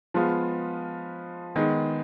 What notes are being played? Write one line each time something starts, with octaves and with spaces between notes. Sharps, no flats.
F3 G#3 B3 F4
D#3 G#3 B3 D#4